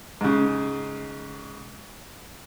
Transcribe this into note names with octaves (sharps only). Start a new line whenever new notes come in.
G#2 C#3